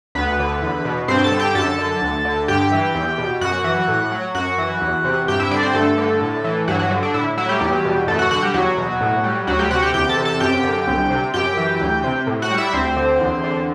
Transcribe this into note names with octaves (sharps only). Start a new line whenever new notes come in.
D2 B3 B4
D3
E2
B2
G2 C4 C5
A4 A5
D3
G4 G5
F#2 A4 A5
D3
D2
D3
G2 G4 G5
E3
E2
B2
F#2 F#4 F#5
E3
A2
F#3
F#2 F#4 F#5
E3
E2
C3
G2 G4 G5
E4 E5
D3 D4 D5
C4 C5
G2 A3 A4
D3
A2
E3
G2 F#3 F#4
F#3 F#4
D3
D4
A2 E4
F#3 E4
G3 G4
E2
B2
F#2 A3 A4
F#4 F#5
D3 F#4 F#5
G3 G4
E2 F#3 F#4
B2
A2
G3
D2 F#3 F#4
G3 G4
C3 F#4 F#5
G4 G5
E2 G4 G5
A4 A5
C3
A4 A5
F#2 G4 G5
D3
C2
C3
F#2 G4 G5
E3
D2
C3
A2
F#4 F#5
G3
E4 E5
D2 C4 C5
D3
E2
D3